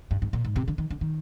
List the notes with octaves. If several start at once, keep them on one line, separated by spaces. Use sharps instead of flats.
G2
G#2
A#2
G#2
C3
D3
D#3
D3
D#3